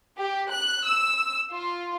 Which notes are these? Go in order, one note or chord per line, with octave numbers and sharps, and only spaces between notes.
G4
F#6
E6
F4